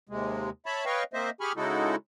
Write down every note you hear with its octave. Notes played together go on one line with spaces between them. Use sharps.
D#2 C3 G#3
C#5 E5 A5 B5
B4 C#5 D#5 F5 G5 C#6
A#3 C4 C5 D#5 E5
G4 G#4 G#5 B5 C#6 F6
C#3 G#3 D#4 E4 F#4 A4